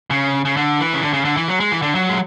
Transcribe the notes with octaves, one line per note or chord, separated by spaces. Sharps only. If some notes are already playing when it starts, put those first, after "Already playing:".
C#3
C#3
D3
E3
C#3
D3
C#3
D3
E3
F#3
G#3
E3
D3
F#3
G#3